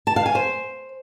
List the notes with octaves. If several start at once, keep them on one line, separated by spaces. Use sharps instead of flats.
A5
F5
G#5
C5